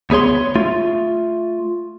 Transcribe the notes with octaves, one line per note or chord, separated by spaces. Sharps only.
D2 B3 G#4 C#5 C6
A3 F4